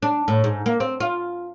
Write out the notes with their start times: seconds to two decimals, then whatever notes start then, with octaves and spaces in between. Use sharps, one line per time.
0.02 D4
0.28 A2
0.44 G#2
0.66 A#3
0.80 C4
1.00 F4